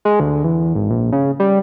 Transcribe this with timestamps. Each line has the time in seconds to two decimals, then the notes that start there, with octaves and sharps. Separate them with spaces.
0.05 G#3
0.20 D2
0.44 E2
0.75 G#1
0.90 A#1
1.12 C#3
1.40 G3